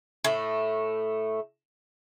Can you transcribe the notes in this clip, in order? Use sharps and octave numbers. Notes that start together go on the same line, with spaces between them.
A2 A3